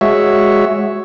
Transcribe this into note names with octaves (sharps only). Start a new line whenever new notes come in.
G#3 F#4 C#5 E5